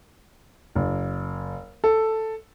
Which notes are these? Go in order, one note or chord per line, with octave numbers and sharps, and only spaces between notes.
F#1
A4